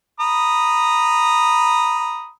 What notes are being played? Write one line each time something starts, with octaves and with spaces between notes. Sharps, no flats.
A#5 B5 D#6